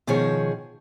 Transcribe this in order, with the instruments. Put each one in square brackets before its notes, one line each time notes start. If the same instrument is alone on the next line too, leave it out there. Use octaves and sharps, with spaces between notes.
[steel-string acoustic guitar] B2 D#3 F3 G#4 C#5